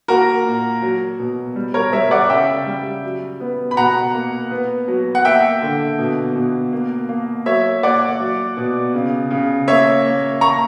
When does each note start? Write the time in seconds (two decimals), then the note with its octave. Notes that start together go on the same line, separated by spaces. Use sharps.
0.08 A#3 F#4 A#4
0.45 A#2
0.82 F#3
1.19 B2
1.56 G3
1.74 A#4 C#5
1.93 G3 C#5 E5
2.11 D5 F#5
2.29 C#3 E5 G5
2.66 G3
3.04 F#3
3.40 B3
3.71 B5
3.77 B2 F#5 A#5
4.14 A#3
4.51 B3
4.88 F#3
5.15 F#5
5.25 A#3 E5 G5
5.62 D3
5.99 B2
6.36 B2
6.72 A#3
7.09 A#3
7.46 F#3 C#5 E5
7.83 A#3 D5 F#5
8.20 F#3
8.57 B2
8.94 C#3
9.31 C#3
9.68 A#3 C#5 E5
10.04 A#3
10.41 A#3 A#5 C#6